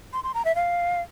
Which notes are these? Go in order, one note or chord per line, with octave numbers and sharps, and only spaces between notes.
C6
C6
A#5
E5
F5